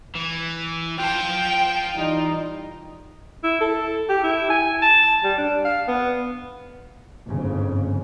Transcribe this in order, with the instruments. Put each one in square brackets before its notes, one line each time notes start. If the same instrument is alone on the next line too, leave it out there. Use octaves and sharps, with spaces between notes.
[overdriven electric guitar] E3
[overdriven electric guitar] F4 A5 [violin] G5
[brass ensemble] E3 G3 D#4
[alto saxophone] E4
A4
G4
E4
G#5
A5
G3
D4
F5
B3
[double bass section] G1 F2 G#2 C#3